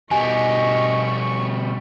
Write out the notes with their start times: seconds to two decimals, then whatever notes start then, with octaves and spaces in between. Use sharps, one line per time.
0.11 B2 G3 D#5 G#5 C#6